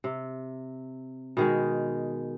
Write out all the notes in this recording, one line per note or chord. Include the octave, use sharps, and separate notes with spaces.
C3
B2 D#3 G#3